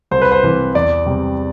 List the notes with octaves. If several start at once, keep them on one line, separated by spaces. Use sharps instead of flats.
C2 C5
B4
C5
C3 E3
E2 D5
C3 G3